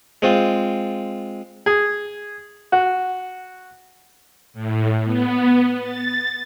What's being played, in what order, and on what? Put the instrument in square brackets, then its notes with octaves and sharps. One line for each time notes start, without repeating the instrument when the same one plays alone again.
[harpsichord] G#3 C4 F4
[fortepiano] G#4
F#4
[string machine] A2
B3
A6